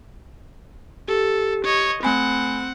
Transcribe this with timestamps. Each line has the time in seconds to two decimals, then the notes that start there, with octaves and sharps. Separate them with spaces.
1.08 G4 A4
1.65 C#5 D#5
2.03 A3 C4 F#5 G#5 B5